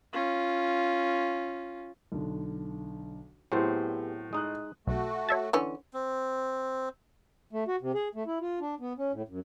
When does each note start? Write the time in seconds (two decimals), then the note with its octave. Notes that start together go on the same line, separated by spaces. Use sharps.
0.13 C#4 F4
2.12 B1 D3
3.52 A2 F#3 B3 C4 G4 G#4 C5
4.33 G#3 D#4 D#6 F#6
4.87 B1 A3 F#4
5.29 C#5 E5 A5
5.53 D3 E3 C#4
5.93 C4
7.51 A3
7.68 F#4
7.81 C3
7.94 G#4
8.15 A3
8.26 E4
8.41 F4
8.60 D4
8.80 B3
8.98 C#4
9.12 A2
9.29 F#2